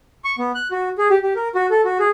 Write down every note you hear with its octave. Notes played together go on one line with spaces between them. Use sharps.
C#6
B3
F#6
F#4
G#4
G4
G4
A#4
F#4
A4
F#4
G#4